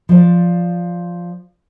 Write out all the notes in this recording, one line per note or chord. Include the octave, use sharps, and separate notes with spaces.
F3 D5